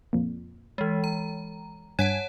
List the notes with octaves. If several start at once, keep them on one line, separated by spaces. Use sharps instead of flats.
F2 A#2
E3 G#3
A#5
G2 C#5 F#5 G#5 A5